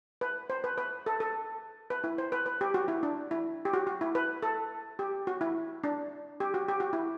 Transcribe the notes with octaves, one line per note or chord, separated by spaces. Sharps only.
B4
C5
B4
B4
A4
A4
B4
E4
C5
B4
B4
G4
F#4
E4
D4
E4
G4
F#4
F#4
E4
B4
A4
G4
F#4
E4
D4
G4
F#4
G4
F#4
E4